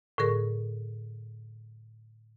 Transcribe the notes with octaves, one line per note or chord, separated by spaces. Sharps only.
A2 D3 G#4 A#4 C#6